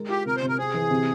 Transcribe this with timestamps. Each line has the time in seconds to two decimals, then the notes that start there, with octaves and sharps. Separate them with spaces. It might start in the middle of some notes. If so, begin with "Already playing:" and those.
Already playing: G#3 A#4
0.09 F4 G4
0.26 C3 A#4
0.36 C5
0.42 C3
0.48 A#4
0.58 C4 G#4
0.74 E3
0.90 C3